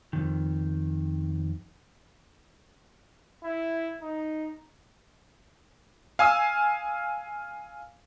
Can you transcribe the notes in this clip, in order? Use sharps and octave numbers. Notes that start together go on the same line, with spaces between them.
F2 G#2 D#3
E4
D#4
F5 G#5 D#6 E6